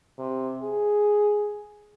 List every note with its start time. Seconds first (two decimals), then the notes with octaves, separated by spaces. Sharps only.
0.18 C3
0.62 G#4